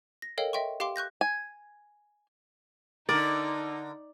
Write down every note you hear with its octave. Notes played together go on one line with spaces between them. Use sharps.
A#6
A4 A#4 C#5 D#5 F5 G5
D#5 E5 G5 C6 C#6
G4 F5 G5 C6 D6
C#6 F#6 G6 A#6
G#5
D3 D#4 A#4 D5